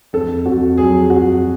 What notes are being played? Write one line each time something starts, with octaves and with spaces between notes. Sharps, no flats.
F2 A4
F2 F#4
F#3 G#4
F2 F#4